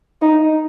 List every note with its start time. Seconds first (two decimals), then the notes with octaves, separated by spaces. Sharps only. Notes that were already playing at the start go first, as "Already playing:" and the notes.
0.22 D#4